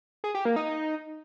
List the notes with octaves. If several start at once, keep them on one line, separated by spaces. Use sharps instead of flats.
G#4
G4
A#3
D#4